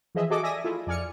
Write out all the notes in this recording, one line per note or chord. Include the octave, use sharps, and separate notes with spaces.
E3 F3 G#4 D#5 E5
F#4 G#4 A4 D#5 D6
D5 E5 G#5 D#6 A#6
A3 E4 F4
F2 D5 G#5 F6 C#7